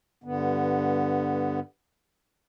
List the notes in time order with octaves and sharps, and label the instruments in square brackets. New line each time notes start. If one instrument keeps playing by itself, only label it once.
[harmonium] G2 D3 B3